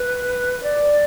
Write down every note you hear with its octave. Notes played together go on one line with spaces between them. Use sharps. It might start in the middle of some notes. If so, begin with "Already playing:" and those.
Already playing: B4
D5